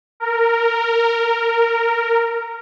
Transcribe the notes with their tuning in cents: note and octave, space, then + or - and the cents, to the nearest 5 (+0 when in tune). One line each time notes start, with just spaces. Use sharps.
A#4 -10